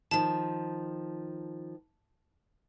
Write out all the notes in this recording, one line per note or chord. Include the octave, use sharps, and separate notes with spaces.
D#3 F3 A5